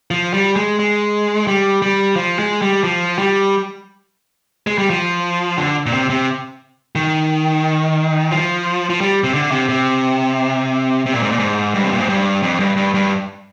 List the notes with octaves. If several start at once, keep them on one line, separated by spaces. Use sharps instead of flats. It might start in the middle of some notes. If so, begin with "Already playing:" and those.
F3
G3
G#3
G#3
G3
G3
F3
G#3
G3
F3
G3
G#3
G3
F3
D3
A#2
C3
C3
D#3
F3
F3
G3
C3
D3
C3
C3
C3
A#2
G#2
A#2
G#2
G2
C3
A#2
G#2
G2
F2
G2
G2
G2